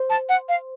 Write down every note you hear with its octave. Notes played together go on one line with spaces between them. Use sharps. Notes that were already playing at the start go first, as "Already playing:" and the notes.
Already playing: C5
A5
F#5
F5